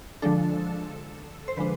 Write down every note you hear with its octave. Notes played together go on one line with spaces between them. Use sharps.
D3 F3 G#3 D4 A4
C5
D3 F3 G#3 D4 B4